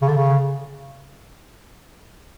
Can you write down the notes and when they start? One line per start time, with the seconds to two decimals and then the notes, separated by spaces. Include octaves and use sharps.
0.02 C#3
0.08 D3
0.17 C#3